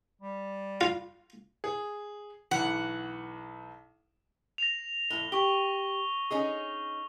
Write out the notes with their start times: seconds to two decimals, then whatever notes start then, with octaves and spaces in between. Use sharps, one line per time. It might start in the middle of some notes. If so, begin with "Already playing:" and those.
0.21 G3
0.81 F4
1.64 G#4
2.51 B1 E3 F#5
4.58 A#6 F7
5.10 F2 A2 G7
5.32 G4 C#6 G7
6.31 C#4 D#4 G#4